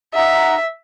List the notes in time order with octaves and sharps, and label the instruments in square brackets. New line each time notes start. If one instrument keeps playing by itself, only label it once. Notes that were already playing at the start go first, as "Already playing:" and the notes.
[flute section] D#4 F#5 A#5 [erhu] E5